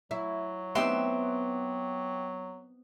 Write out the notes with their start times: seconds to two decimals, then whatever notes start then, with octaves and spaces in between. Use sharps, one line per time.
0.11 F#3 E4
0.75 B3 C4 D#4 G4 E5 C6